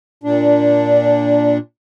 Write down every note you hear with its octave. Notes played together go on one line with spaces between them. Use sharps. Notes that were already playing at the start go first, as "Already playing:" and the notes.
A#2 D4